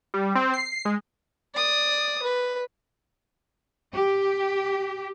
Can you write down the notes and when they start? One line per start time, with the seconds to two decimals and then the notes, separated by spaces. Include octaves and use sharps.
0.14 G3
0.36 C4
0.54 C7
0.85 G#3
1.55 D5 D#6
2.22 B4
3.93 G4